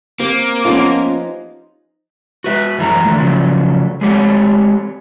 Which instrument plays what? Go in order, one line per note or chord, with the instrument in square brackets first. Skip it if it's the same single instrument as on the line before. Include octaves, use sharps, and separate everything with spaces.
[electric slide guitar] A#3 [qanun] C4 G4
[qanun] F3 D#4 B5 [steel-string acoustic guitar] B3 C#4 F4
[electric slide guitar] F#4 B4 E5
F#2 E3 E4 A4 A#5
D3 D#3 A3
C#3 F3 F#3 A3
G#3 A3 C4 G4 C#5